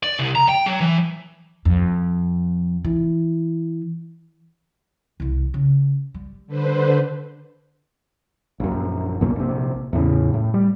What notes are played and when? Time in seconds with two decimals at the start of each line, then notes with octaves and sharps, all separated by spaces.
0.03 D5
0.19 C2
0.35 A#5
0.49 G5
0.66 F#3
0.81 E3
1.65 F2
2.85 E3
5.20 C2 E3
5.54 C#3
6.14 G3
6.47 D3 B4 C5
8.60 A#1 F#2
9.21 B1 F#2 B2 A#3
9.36 A#1 C3
9.93 E2 A2 C#3
10.34 A2
10.54 G3